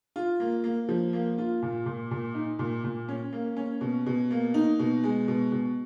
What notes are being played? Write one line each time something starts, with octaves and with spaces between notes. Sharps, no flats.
F4
A#3
A#3
F3
A#3
F4
A#2
A#2
A#2
D#4
A#2
A#2
C#4
A#3
C#4
B2
B2
A#3
D#4
B2
G#3
B2
B2